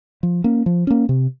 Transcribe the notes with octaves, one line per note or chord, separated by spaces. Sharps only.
F3
A#3 C#4
F3
A#3 C#4
C3